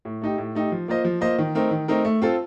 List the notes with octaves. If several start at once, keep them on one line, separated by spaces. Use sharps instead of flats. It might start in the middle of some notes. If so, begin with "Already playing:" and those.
A2
A3 D#4 G4
A2
A3 D#4 G4
F3
A#3 F4 C5 D#5
F3
A#3 F4 C5 D#5
D#3
A3 C4 D#4 A#4
D#3
A3 C4 D#4 A#4
A3
C4 F4 A4